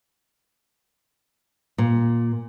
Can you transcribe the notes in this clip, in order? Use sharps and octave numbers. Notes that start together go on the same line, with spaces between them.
A#2